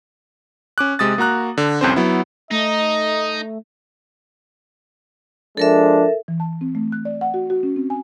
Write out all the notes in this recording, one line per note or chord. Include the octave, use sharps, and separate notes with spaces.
C#4 D6 F#6
C3 G#3 D#6 A6
A#3 F#4 A#5 F#6
D3
C2 F2 C4 C#4 C5
F#3 B3 E4
A3 D#4 D#5
F3 G#3 D4 A4 A#4 E5
E3
A5
C4
A3
F#6
D5
F#5
F#4
F#4
C#4
C4
G#5